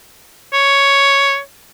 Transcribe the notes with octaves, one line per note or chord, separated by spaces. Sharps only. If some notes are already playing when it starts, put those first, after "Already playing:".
C#5